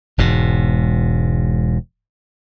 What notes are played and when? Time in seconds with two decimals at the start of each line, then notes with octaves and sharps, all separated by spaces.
0.18 E1 G#2 B2